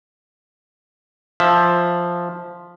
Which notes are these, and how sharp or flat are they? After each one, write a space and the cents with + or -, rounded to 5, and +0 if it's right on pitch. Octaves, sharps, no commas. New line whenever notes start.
F3 +0 E5 +0